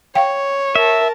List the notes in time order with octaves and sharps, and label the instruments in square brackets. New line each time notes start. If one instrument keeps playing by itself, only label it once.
[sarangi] C#5 [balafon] F5 G5
[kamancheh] A#4 A5 [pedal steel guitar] E5